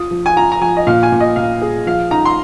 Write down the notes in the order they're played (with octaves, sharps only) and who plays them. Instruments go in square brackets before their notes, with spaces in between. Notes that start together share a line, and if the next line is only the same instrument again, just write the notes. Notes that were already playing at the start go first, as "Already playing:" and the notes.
Already playing: [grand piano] F4 [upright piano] D#6
[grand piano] F3
[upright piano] G#5
[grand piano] F4 [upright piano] A#5
[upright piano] A#5
[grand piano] F3 [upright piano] G#5
[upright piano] D#5
[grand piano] A#2 [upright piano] F5
[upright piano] G#5
[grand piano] A#2
[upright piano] D#5
[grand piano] A#2 [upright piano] F5
[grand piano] G#4
[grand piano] F3 [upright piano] F5
[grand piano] D#4 [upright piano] A#5
[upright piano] C6